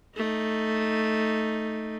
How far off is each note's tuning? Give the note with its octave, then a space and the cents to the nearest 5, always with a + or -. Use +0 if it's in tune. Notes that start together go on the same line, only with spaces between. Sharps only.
A3 +0 D#4 +0